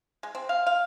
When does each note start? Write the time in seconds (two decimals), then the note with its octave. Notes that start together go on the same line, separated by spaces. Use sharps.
0.23 G#3
0.35 C4
0.49 F5
0.66 F5